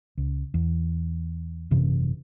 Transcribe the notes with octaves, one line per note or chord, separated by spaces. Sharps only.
C#2
E2
G#1 F#2 C3 E3